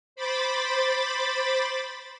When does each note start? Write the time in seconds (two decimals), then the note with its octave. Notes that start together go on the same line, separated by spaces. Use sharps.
0.16 C5 B5 D6 A6